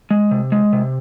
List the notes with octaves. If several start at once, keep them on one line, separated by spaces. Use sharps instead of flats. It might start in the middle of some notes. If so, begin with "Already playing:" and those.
G#3
C3
G#3
C3